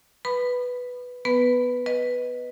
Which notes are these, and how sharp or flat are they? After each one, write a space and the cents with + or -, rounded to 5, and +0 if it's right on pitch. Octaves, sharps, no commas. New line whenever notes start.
B4 +0 B5 +0 D#6 -35
B3 +5 B4 +0
B4 +0 D#5 +0